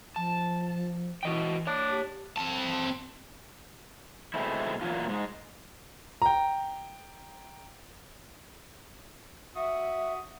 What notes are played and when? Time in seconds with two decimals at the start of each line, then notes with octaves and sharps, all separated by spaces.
0.16 F3 A5
1.23 E3 F#4 D#5 G5
1.67 D4 C#5 A5
1.91 G4
2.36 C4 A5
4.34 B2 D3 G#3 A3 C4 E4
4.81 E2 A#2 E3 F#3 C#4 F4
5.08 G#2 G#3
6.22 G5 A#5
9.56 F#4 E5 D#6